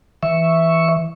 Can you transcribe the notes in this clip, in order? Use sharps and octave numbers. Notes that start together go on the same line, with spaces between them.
E3 E5 C#6